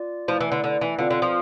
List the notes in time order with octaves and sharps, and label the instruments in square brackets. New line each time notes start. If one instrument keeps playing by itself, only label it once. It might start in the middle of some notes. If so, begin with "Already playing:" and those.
Already playing: [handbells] F4 D5
[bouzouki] F3 [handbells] A3 E4 B4 D5 A5
[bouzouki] E3
D3
D3
E3
[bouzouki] D3 [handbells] C4 F4 B4 F5
[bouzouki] D3
F3